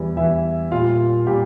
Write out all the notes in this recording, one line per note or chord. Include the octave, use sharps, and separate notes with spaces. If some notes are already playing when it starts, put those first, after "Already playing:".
Already playing: E2 E3 G3
E2 E3 G3 E4 E5
A#2 G3 F4 F5
A#2 G3 G4 G5